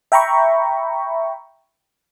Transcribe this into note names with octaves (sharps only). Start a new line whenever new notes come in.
E5 G5 A#5 B5 C#6